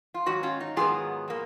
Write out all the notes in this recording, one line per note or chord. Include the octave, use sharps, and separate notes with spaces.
F4
G#2 D#3 F#3 F#4
C#4 F4
D#4
G#2 D#3 F#3 B3 F4 G#4
B2 A#3